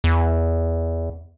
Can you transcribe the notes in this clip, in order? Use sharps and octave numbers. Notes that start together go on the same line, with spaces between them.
E2